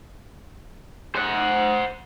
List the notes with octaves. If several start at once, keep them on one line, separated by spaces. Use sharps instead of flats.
C5 F#5